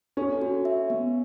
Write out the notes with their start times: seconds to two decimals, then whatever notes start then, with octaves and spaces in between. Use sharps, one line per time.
0.17 C#4 A4
0.41 F#4
0.65 E5
0.90 B3